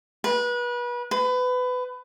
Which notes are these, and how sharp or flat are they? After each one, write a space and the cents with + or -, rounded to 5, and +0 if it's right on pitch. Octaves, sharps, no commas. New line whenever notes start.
B4 -30
B4 +25